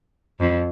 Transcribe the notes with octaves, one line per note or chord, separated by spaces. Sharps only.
F2